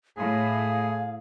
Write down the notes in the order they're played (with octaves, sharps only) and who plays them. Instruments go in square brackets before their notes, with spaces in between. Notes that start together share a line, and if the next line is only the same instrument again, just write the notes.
[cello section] A2 [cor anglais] G#4 [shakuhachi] F5